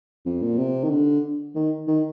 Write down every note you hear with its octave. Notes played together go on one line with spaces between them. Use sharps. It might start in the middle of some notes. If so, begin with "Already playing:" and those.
F2
A#2
C3
D#3
D3
D#3
D#3